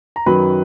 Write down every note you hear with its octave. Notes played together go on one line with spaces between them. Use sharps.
A#5
F#2 D#3 F#3 B4 B5